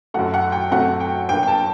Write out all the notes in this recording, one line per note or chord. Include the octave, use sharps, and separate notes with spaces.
F#2 F#3 A3 F#5
F#5
G5
F#2 F#3 A3 C4 F#5
G5
G2 F#3 A#3 G5
G5
A5